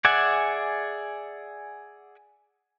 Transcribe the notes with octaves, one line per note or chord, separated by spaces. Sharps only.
G#4 D5 E5 F#5 G#5